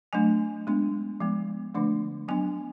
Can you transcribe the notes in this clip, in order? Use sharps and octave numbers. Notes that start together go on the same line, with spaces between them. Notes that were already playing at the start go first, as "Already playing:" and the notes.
F#3 A3 D4 G#5
G#3 B3 D4
F3 G#3 B3
D3 F3 A3 D4
F#3 B3 D4 G#5